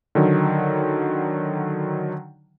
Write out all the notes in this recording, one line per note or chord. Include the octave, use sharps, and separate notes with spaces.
D3 D#3 F#3